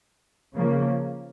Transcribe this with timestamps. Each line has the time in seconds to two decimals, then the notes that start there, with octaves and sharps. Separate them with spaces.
0.55 C#3 F3 A#3